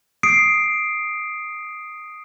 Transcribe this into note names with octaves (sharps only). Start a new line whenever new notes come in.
D#6 C7 D7